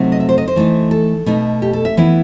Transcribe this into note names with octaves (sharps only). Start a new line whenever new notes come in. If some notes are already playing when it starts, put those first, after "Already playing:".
Already playing: C3 F#3 A3 D#4
D#5
E5
C5
D#5
C5
E3 A3 D#4
A4
B2 A3 D#4
G4
A4
E5
E3 B3 E4